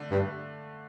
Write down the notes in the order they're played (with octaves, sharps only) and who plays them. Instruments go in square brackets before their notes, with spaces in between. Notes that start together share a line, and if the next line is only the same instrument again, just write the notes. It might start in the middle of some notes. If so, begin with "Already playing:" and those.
Already playing: [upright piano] D3 A3
[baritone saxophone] G2